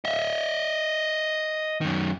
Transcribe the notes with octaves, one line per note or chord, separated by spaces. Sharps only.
D#5 E5
F#2 D#3